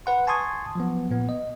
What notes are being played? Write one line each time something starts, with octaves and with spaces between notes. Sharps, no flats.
B4 F#5 C6
G#5 A5 C6 C#6 D#6 G#6
F3 F#3 B3
A#2 B3
D#5